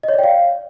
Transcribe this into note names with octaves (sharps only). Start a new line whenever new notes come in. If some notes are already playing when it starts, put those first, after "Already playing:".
D#5
C#5
D5
G5
F5